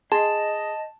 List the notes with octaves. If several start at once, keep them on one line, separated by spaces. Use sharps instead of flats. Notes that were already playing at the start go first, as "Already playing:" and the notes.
G#4 D#5 A5 C6